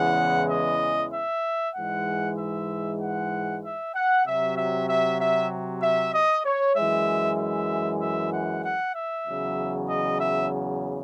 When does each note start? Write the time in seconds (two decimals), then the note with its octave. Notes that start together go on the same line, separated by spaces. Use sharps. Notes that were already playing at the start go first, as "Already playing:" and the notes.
Already playing: E2 C#3 E3 G#3 F#5
0.51 D#5
1.14 E5
1.76 G#2 E3 G#3 F#5
2.38 E5
3.02 F#5
3.64 E5
3.95 F#5
4.26 C3 F#3 E5
4.57 E5
4.89 E5
5.21 E5
5.82 E5
6.14 D#5
6.45 C#5
6.76 F#2 E3 G#3 E5
7.39 E5
8.01 E5
8.33 F#5
8.65 F#5
8.95 E5
9.26 E2 C#3 F#3
9.89 D#5
10.21 E5